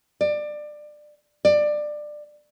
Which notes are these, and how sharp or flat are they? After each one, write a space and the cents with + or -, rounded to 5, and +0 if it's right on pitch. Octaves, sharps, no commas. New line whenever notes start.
D5 +25
D5 +20